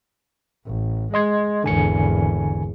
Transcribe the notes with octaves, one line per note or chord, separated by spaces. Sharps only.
A1
G#3 D#5 C6 G#6
G#1 E2 D3 G#5 C#7